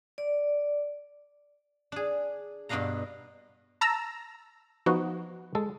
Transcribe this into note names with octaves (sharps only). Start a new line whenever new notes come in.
D5
D4 G#4
G2 B2 B3 D4 F5 A#5
A5 A#5 E6
F3 B3 D#4 F#4
G#3 A4